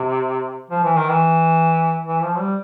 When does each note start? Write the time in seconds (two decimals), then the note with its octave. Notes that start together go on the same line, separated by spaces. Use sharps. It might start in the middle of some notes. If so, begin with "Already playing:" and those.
Already playing: C3
0.71 F3
0.84 E3
0.97 D#3
1.10 E3
2.06 E3
2.23 F3
2.40 G3